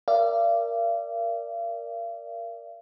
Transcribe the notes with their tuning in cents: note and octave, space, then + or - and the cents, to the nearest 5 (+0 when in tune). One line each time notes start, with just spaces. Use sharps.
A#4 +0 D5 +0 F5 -40